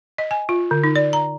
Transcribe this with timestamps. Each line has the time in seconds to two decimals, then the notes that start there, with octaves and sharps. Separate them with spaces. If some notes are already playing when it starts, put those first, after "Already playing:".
0.18 D#5
0.31 G#5
0.49 F4
0.71 D3
0.84 D#4
0.96 D5
1.13 A#5